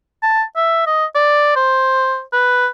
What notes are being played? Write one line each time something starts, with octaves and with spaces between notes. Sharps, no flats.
A5
E5
D#5
D5
C5
B4